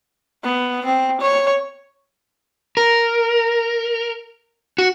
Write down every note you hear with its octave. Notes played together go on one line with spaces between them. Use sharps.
B3
C4
C#5
A#4
F#4